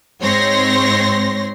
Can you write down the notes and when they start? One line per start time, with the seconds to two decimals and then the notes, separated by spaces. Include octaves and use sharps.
0.21 G#2 C4 C#5 C6 A#6